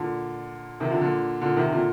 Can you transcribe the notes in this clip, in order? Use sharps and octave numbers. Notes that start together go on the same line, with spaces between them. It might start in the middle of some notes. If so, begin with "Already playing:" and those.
Already playing: A#2 D3
C3 D#3
D3 F3
A#2 D3
A#2 D3
C3 D#3
A#2 D3